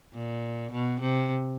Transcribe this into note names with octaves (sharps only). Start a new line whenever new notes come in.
A#2
B2
C3